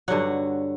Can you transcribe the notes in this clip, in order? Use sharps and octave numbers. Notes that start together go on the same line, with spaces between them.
G2 D3 F#3 F#5